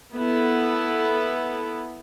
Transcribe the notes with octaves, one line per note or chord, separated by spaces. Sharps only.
B3 E4 A4